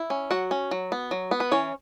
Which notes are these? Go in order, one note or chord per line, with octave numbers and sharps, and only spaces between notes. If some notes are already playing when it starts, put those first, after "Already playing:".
Already playing: E4
C#4
F#3 F#4 F#5
C#4
F#3
B3
F#3
B3
B4
E3 C#4 C#5